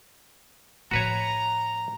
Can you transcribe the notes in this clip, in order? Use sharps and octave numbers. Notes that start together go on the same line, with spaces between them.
A2 F3 F#4 B4 C#5 A#5